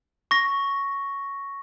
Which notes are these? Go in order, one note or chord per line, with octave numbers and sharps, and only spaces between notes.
C#6 A#6